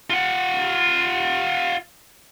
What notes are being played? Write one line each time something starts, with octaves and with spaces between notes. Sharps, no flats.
F4 F#5